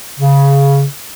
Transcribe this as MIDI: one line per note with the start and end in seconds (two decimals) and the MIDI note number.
0.19 0.83 49